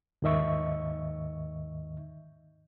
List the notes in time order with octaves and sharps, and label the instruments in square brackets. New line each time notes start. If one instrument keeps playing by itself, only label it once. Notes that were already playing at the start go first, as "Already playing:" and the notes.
[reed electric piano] D#2 G#2 D#3 D#5 E5 C#6